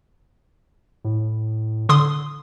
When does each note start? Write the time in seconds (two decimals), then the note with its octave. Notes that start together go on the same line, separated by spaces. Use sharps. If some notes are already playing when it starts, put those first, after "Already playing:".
1.05 A2
1.89 D3 C6 D#6